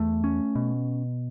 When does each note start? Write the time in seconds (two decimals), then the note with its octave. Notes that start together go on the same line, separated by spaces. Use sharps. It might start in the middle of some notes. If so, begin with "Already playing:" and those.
Already playing: E2 A3
0.24 C#4
0.55 B2